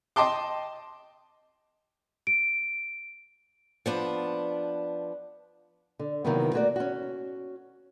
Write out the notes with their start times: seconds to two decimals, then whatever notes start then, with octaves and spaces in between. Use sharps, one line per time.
0.16 D#5 G5 A5 C6 D6
2.27 D7
3.86 F3 B3 D4
5.99 D3
6.24 C3 D#3 E3 F#3 A#3 B3
6.53 A3 A#3 F#4 C#5 D5
6.76 C#4 F#4